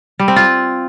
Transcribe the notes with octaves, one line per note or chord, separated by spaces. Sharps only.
G3
C4
F4